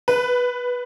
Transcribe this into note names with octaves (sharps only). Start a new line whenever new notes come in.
B4